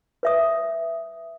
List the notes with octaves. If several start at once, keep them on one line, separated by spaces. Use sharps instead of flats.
B4 E5 D#6